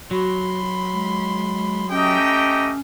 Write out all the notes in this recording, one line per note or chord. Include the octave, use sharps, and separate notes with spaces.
F#3 F#4 B5 C6
G#3
A3 C#4 G4 D#5 G5 A#5